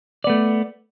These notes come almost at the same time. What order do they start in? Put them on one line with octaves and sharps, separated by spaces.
D5 B3 A3